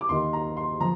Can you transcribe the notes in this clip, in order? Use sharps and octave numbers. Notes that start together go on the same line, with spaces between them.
D6
D#2 D#3 C6
A#5
C6
F3 A#5